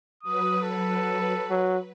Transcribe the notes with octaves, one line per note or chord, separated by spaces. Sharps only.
F#3 B4 D#6
A4
F#3